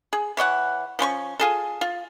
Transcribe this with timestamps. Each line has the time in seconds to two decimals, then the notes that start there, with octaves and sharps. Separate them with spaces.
0.13 G#4
0.37 E3 C#5 D#5 F#5
0.99 F3 C#4 C6 C#6
1.40 F4 G#4 A4
1.81 F4